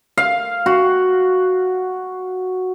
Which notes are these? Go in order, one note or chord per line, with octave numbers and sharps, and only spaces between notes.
F5
F#4